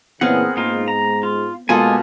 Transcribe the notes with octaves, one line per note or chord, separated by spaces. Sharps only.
A#2 C#3 E3 B3 C4 G#4 A#4 F#5
G#2 A#3 D#4 F4
A#5
F4
B2 G#3 A#3 F4 A4 G#5 D#6